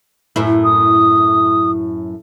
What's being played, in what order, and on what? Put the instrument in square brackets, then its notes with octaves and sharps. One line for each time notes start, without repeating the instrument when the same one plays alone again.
[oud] F#2 A2 E4
[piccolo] D#6